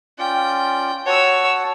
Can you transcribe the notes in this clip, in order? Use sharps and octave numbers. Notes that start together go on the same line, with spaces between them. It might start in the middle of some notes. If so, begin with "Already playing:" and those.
C#4 F4 D5 G5
F#4 C#5 F#5 A5 E6